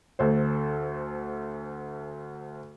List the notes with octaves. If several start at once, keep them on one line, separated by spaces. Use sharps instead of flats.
D2 A4 C5